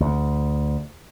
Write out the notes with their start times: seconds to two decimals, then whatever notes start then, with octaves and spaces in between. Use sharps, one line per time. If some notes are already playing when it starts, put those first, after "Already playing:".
0.01 D2